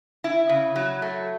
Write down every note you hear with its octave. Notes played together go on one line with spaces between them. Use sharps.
E4
C#3
F#3
A3